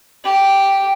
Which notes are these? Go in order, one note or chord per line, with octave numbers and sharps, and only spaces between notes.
G4